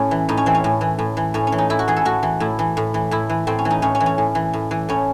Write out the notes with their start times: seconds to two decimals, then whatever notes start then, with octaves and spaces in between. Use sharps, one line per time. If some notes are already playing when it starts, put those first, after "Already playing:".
Already playing: A2 C#4
0.11 E3
0.29 A2 D#4
0.37 C#4
0.46 E3 C4
0.55 C#4
0.64 A2
0.81 E3
0.99 A2
1.17 E3
1.34 A2 C#4
1.47 C#4
1.52 E3
1.58 D#4
1.70 A2 E4
1.79 F#4
1.88 E3 G#4
1.97 A4
2.05 A2 F#4
2.23 E3
2.40 A2 E4
2.59 E3
2.77 A2
2.94 E3
3.11 A2 E4
3.30 E3
3.47 A2 C4
3.59 C#4
3.65 E3
3.71 D#4
3.82 A2 C#4
3.95 C#4
4.00 E3
4.06 C#4
4.18 A2
4.35 E3
4.54 A2
4.71 E3
4.89 A2 C#4